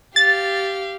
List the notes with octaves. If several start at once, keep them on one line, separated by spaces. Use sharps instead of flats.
G4 F5 A6